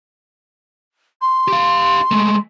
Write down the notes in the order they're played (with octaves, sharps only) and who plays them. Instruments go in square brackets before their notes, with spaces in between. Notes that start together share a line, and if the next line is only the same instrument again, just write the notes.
[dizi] C6
[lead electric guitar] G4 F5
G#3 A3